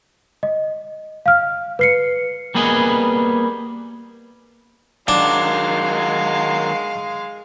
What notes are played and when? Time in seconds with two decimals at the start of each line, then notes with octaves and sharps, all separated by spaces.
0.43 D#5
1.26 F5 F6
1.79 B4 C7 C#7
2.55 G3 A#3 B3 G#4 B4 D#5
5.08 D#3 F#3 G#3 D4 F5